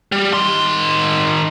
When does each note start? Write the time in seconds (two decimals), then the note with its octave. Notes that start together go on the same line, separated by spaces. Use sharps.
0.12 G3
0.33 D#3 C6